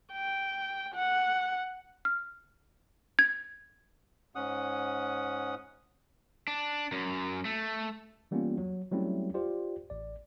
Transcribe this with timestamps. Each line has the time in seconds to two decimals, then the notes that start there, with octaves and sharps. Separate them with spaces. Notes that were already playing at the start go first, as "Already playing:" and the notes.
0.13 G5
0.95 F#5
2.05 F6
3.19 G#6
4.35 G#2 C#4 F#5 D#6
6.48 D4
6.92 F#2
7.45 A3
8.31 E3 G3 A#3 B3 C#4 F4
8.58 F#3
8.91 F#3 G3 A3 C4 C#4 E4
9.34 F4 G4 C5 D5
9.90 A1 D5